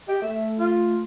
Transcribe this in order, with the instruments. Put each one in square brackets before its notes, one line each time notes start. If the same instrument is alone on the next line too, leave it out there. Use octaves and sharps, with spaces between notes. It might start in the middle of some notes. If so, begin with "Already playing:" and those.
[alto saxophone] G4 [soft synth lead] D#5
[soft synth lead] A3 [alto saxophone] E5
[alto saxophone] F4